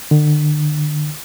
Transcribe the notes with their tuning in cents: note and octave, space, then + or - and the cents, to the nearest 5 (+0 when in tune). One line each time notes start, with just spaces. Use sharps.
D3 +40